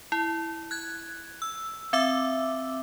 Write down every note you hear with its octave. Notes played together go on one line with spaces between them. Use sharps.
E4
F#6 G#6
E6
C4 E5 D6 E6